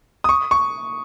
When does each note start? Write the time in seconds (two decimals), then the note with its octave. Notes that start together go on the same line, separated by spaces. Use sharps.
0.24 D#6
0.29 C#6
0.51 C#6